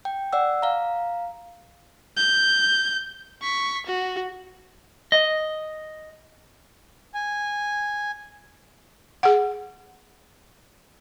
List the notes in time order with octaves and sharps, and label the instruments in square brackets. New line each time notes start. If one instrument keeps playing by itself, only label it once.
[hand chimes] G5
D5 F#5 E6
F5 A#5
[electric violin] G6
C#6 B6
F#4
[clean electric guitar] D#5
[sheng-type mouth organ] G#5
[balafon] G#4 F#5